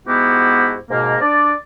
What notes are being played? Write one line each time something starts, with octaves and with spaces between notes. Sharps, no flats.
G#2 B3 E4 F#4 G4
G#2 B2 A#3
D4 D5